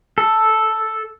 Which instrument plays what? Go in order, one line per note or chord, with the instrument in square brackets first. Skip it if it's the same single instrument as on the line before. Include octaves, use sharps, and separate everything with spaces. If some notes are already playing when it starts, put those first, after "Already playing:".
[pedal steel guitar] A4